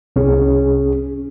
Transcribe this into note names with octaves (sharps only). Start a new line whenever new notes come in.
C2 C#4 G#4